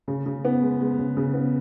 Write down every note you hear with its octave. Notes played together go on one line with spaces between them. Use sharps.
C#3
C#3
B3
G#3
G#3
C#3
C#3
B3